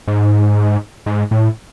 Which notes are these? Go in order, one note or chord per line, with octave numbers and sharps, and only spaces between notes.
G#2
G#2
A2